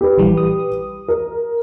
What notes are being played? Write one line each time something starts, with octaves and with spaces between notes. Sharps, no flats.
G4 B4
A#1 E3 G3
D#6
A#4